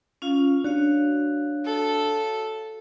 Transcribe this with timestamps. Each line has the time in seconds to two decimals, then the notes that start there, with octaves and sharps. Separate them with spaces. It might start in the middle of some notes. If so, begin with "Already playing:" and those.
0.22 C#4 F4 F5
0.64 D4 F#4 C#5 F5
1.65 A4